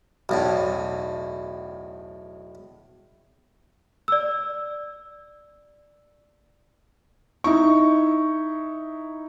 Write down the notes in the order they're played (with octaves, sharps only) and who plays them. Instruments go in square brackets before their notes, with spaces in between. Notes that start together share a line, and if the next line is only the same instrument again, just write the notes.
[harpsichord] B1 E2 A2
[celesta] D5 E6
[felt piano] D#4 E4 C#6